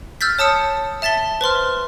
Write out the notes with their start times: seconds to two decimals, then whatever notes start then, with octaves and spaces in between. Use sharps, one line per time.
0.21 E6 F6 G6 A6 B6
0.39 C#5 A5 D#6 E6 C#7
1.02 E5 A5 A6 B6 G7
1.41 B4 C5 C6 F6